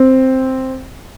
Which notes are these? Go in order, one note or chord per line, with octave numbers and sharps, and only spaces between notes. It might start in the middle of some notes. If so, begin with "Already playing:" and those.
Already playing: C4